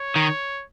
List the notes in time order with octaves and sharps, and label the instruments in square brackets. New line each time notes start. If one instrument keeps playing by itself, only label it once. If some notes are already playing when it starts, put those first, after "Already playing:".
Already playing: [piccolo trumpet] C#5
[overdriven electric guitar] D#3